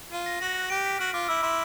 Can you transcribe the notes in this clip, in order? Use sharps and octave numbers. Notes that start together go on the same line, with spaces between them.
F4 D#7
A#6
F#4 A#6
F#6
G4 D7
B6
F#4 F6
F4 D6
E4 E6
E4 C6